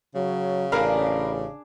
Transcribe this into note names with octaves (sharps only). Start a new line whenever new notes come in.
C#3 F#3
A1 D4 G#4 A#4 F5 B5